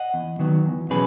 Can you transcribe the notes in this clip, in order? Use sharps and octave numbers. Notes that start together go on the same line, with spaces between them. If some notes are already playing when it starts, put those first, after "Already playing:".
Already playing: D#5 F#5
E2
D#3 F#3 B3
E2
B2 F#3 C#4 G#4 B4